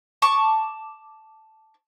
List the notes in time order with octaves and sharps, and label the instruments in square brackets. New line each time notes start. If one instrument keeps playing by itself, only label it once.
[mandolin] A5 C#6 D6